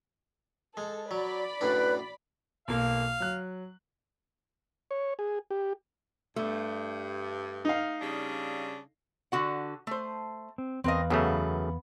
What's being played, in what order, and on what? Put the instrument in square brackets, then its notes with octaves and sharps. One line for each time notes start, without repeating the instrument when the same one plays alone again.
[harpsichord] G#3 [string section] A4
[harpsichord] F#3 [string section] D5 B5
[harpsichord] F#2 A2 D4 [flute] B4
[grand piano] B1 A#3 [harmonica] F5
[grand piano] F#3 F#6
[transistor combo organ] C#5
G#4
G4
[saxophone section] G2 [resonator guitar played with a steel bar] A3
[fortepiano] D#4 F5
[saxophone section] C#3 G3 D4
[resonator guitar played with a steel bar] D3 F#4 F#5
A3 C5
[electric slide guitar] C4
[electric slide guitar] E2 B4 F5 [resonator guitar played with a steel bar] C4 A#4 D#5
[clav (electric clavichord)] F#2 C#3 A3 [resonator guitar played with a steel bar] B3